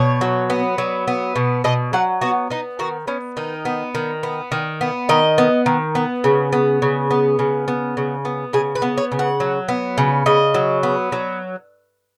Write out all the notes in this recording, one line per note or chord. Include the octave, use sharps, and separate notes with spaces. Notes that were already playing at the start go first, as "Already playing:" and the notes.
Already playing: B2 C#5
F#3
B3
F#3
B3
B2
B2 D#5
F#3 F#5
B3 F#4
B3 D#4
D#3 F#4
B3 C#4
D#3 D#4
B3
D#3
B3
D#3
B3
D#3 D#5
B3
D#3
B3
C#3
B3
C#3
B3
C#3
B3
C#3
B3
C#3 G#4
B4
B3
C#5
C#3
F#5
F#3
B3
C#3
C#3 D#5
F#3
B3
F#3